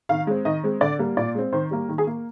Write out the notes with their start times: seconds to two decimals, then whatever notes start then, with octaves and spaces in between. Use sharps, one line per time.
0.09 D#3 F5
0.27 G#3 C4
0.45 D#3 D#5
0.64 G#3 C4
0.81 D3 D5
0.99 G3 A#3
1.17 A#2 D5
1.35 G#3 C4
1.53 D#3 C5
1.71 G3 A#3
1.89 D#3
1.98 G#4
2.07 A#3